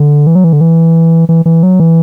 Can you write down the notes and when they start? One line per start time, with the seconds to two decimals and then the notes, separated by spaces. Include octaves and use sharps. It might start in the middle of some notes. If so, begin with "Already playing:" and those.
Already playing: D3
0.27 E3
0.35 F#3
0.44 E3
0.53 D3
0.61 E3
1.29 E3
1.46 E3
1.63 F#3
1.80 E3